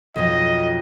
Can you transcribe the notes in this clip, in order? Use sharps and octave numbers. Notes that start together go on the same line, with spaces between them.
B1 F2 D#5